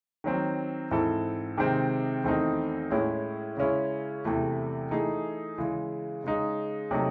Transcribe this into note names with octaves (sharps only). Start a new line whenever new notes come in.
D#3 F#3 C4
G#2 E3 C4 E4 A4
C3 D#3 G#3 C4
E2 D#3 A3 C4 D#4
A2 G#3 C#4 E4
C#3 G#3 C#4 E4
E2 C3 E3 A3
E3 A3 D#4 G#4
C#3 E3 G#3
C#3 G#3 D#4
C3 F#3 A3 D#4